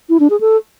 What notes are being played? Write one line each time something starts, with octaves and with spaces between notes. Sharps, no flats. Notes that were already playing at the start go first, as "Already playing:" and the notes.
E4
D4
G#4
A4